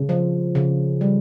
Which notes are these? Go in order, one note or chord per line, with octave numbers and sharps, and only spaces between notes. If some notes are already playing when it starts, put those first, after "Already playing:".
Already playing: C#3
F3
C#3
G3